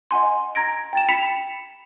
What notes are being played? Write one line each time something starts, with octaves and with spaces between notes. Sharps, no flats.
D#5 F#5 G#5 C6
A#5 G#6 A#6 D7
G5 A6 E7
B5 B6 C#7 E7 F7